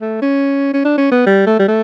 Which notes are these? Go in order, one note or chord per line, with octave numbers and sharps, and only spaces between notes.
A3
C#4
C#4
D4
C#4
B3
G3
A3
G3
A3